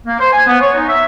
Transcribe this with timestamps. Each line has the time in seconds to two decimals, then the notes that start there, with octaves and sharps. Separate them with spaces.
0.06 A#3
0.20 C5
0.33 G#5
0.47 B3
0.61 C#5
0.74 D#4
0.89 E5